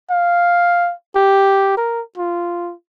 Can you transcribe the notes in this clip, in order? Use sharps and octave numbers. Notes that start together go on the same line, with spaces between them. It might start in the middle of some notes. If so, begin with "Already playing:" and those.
F5
G4
A#4
F4